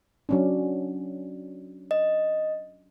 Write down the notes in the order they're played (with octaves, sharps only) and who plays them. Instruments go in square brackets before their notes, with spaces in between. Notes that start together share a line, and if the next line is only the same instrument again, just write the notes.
[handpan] F#3 C#4 D4
[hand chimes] D#5